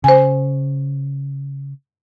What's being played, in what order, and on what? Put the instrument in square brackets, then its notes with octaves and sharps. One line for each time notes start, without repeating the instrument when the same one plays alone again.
[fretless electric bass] C#3 [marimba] C5 G#5